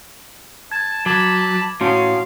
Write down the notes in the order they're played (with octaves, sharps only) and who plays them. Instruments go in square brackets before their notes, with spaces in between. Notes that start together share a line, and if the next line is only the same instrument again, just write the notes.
[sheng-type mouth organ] A5 [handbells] G#6
[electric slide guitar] F#3 [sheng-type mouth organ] A5 B5 [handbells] D6 G#6
[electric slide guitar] A2 C#4 [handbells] F#4 C6 [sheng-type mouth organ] F5